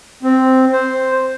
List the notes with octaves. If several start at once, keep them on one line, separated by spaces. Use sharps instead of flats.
C4
C5